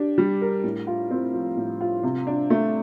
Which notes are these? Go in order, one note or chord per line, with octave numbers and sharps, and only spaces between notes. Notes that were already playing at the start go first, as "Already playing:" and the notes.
Already playing: D4 G4
G3
A#4
A2
F4
C4
F3
A2
F4
C3
D4
A3